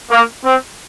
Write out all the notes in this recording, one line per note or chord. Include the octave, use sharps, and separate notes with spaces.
A#3
C4